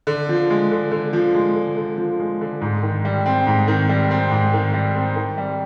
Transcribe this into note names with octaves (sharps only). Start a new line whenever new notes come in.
D3
F3
G#3
D3
D3
F3
G#3
D3
D3
F3
G#3
D3
G#2
D#3
G3
C4
G#2
D#3
G3
C4
G#2
D#3
G3
C4
D#3
G3